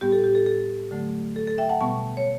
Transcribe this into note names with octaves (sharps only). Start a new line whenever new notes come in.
A2 G3 B3 G4
A4
G4
A4
A4
D3 F#3 A3
A4
A4
E5 G5
F#5 A5
B2 G3 B3 A5 C#6
C#5